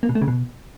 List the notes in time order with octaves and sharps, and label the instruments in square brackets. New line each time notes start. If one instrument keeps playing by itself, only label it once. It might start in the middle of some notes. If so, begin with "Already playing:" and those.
[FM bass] A#3
B2
A3
C#3
B2